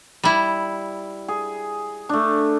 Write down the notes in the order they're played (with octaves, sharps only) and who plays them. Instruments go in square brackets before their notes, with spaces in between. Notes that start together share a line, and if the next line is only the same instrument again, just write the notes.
[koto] G3 E4
[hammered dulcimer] G#4
A3 D4